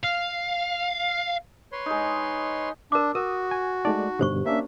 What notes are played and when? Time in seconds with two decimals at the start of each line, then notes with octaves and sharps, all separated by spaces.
0.04 F5
1.72 B4 C#5 C6
1.86 G#3 D#4
2.92 D4 A#4 D6
3.15 F#4 A#4 D#6
3.51 G#5
3.85 G#3 A3 D#4 D5
4.19 G2 B2 D3 G4 C5 C#6
4.46 A#3 C#4 D4 E5